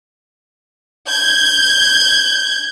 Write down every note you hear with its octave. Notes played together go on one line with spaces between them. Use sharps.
G6 G#6